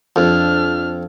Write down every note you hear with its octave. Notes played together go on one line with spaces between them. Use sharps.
F2 D4 F6